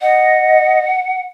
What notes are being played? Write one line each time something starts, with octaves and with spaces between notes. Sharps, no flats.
D#5 F#5